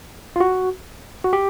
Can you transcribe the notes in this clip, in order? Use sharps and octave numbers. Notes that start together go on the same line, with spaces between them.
F4
F#4
F#4
G4